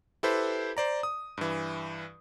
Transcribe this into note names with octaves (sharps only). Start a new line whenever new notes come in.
E4 G4 A4 B4 C5
C5 D5 A#5
D#6
G2 E3